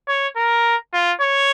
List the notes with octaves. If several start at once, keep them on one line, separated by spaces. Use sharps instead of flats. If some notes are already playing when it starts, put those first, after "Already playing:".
C#5
A#4
F4
C#5